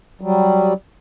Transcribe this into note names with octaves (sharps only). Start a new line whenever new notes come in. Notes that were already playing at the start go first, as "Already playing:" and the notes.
F#3 G3